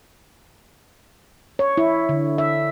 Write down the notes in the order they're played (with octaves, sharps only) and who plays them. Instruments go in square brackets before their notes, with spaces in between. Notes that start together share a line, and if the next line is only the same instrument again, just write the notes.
[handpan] C#5
E4
D3
E5